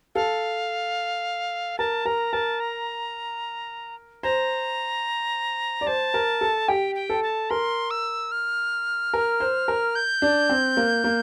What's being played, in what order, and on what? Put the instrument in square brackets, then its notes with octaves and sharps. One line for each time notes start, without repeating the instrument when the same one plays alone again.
[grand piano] A4 [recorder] F5
[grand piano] A#4 [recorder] A5
[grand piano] A#4 [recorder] A#5
[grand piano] A#4 [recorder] A5
[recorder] A#5
[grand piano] C5 [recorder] A#5
[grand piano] D5
[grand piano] C5 [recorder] A5
[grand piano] A#4
A4
[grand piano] G4 [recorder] G5
[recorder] G5
[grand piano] A4
[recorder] A5
[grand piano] A#4 [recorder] C6
[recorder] E6
F6
[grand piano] A#4
C5
A#4
[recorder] G6
[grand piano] D4
C4
A#3
A#3